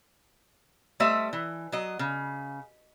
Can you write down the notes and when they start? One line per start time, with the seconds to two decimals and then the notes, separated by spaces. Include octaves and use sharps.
1.00 G3 A3 C5 D#5 E5
1.33 E3
1.72 F#3 D#5
1.99 C#3